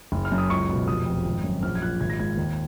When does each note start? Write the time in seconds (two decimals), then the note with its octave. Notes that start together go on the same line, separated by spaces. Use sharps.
0.12 F#1
0.25 F6
0.32 F#2
0.38 D#6
0.50 C#2 C#6
0.69 B2
0.88 F1 D#6
1.06 F2
1.25 G#1
1.44 F#2
1.63 A#1 F6
1.75 G#6
1.81 A#2 F#6
2.01 G#1 G#6
2.10 A#6
2.19 G#2 G#6
2.38 D#2